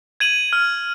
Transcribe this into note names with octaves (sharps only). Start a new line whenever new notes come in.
G#6 D#7 F#7
F6